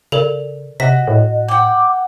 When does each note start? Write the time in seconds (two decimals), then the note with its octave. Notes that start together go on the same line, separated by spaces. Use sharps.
0.12 C#3 A4 A#4 D5
0.80 C3 F#4 D#5 B6
1.08 A2
1.48 F#5 G5 D6